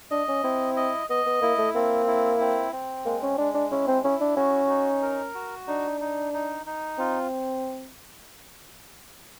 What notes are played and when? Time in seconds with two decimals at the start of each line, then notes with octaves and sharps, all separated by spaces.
0.11 D4 D#5
0.28 C#4
0.43 C4 E4
0.76 D#5
1.10 B3 D#5
1.26 B3
1.42 A#3 E4
1.58 A3
1.75 A#3 C4
2.07 E4
2.40 C4
2.73 C4
3.05 G#3 A#3
3.22 C#4
3.38 G#3 D4
3.54 D4
3.71 C#4 E4
3.88 C4
4.04 C#4 E4
4.21 D4
4.36 C#4 F#4
4.69 D#4
5.02 A#4
5.34 F#4
5.67 D4 D#4
6.00 D#4
6.33 D#4
6.66 D#4
6.98 C4 F4